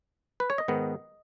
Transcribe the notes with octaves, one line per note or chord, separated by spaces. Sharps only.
B4
C#5
D#5
G#2 D#3 B3